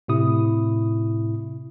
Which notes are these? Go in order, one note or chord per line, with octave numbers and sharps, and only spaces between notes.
A2 C3 E4 D#6